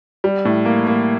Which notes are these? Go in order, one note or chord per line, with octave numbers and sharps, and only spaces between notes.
G3
A2
A#3
A#3